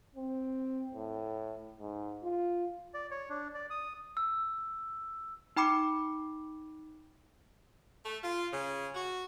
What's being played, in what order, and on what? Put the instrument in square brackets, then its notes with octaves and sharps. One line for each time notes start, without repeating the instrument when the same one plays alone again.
[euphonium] C4
A2
G#2
F4
[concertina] D5
C#5
D4
D5
D#6
[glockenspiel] E6
[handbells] D#4 G5 B5 D6 C#7
[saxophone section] A3
F4
C#3
F#4